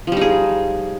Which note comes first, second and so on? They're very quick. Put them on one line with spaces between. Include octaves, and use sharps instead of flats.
F3 G3 D#4 G#4